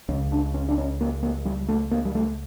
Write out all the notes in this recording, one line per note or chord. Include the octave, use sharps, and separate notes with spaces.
C#2 C#3 C#4
D4
C#4
D4
C#4
A#3
A#3
G3
A3
A#3
G3
A3